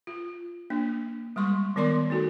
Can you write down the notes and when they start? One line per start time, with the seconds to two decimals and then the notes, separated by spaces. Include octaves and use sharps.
0.07 F4
0.70 A#3 D4
1.36 G3 G#3 C6 C#6
1.76 D#3 B3 A#4 D5 C6 D6
2.10 A3 D#4 F#4 A4